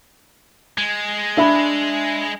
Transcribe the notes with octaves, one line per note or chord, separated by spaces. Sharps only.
G#3
D4 E5 B5